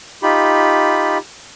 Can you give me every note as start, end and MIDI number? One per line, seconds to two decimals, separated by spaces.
0.23 1.18 63
0.23 1.18 65
0.23 1.18 67
0.23 1.18 83